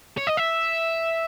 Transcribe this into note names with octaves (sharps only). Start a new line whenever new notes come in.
C#5
D#5
E5